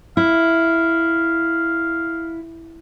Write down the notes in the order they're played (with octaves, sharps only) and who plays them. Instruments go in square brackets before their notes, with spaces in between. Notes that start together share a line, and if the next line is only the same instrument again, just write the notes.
[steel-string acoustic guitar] E4 [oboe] F5